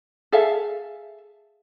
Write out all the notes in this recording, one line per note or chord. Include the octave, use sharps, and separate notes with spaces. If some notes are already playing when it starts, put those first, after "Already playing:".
G#4 A4 E5 F5